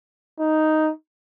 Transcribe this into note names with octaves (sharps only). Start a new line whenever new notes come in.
D#4